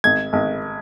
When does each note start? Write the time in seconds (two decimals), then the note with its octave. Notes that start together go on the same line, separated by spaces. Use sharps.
0.04 G#1 G#6
0.33 G#1